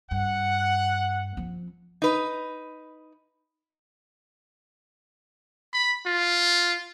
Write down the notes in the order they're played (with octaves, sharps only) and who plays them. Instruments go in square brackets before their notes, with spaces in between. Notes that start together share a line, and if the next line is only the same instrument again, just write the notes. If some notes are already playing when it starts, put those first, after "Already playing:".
[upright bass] G2 [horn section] F#5
[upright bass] F3 C4
[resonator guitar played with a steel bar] D#4 B4
[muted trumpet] B5
F4